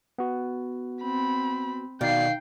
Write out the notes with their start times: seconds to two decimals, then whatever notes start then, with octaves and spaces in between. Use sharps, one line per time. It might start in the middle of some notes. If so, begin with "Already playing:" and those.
0.18 B3 F#4
1.03 C4 B5
2.01 B2 D#3 D5 F5 G5 C7